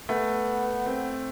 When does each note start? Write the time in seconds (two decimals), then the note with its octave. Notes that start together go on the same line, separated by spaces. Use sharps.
0.09 A3 B3
0.86 C4